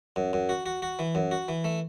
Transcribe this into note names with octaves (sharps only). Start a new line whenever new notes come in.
F#2
F#2
F#4
F#4
F#4
E3
F#2
F#4
E3
A3